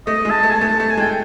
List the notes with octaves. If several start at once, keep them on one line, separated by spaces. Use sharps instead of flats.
A3 D#5
G#3
A5
A3
G#5
A5
A3
A3 A5
G#5
G#3
G5